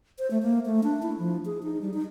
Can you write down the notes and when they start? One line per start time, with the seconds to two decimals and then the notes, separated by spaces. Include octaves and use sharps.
0.19 C5
0.31 A3
0.43 A#3
0.66 A3
0.84 D4
1.02 E4
1.19 F3
1.45 G#4
1.63 D#4
1.81 G3
1.94 D#4